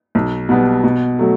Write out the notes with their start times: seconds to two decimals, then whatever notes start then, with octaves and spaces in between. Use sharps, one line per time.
0.15 B1
0.49 B2 G3 B3
0.83 B2
1.19 F#3 A3